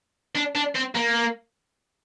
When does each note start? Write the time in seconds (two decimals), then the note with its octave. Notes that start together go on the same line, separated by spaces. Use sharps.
0.35 D4
0.56 D4
0.76 C4
0.95 A#3